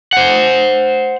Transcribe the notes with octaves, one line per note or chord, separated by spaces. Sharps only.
C5 F#5